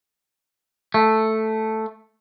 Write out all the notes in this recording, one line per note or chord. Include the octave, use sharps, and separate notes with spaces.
A3